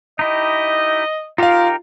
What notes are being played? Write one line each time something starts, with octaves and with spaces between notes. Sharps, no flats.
D#4 E4 G4 D#5
D#4 F4 G4 A#4 F5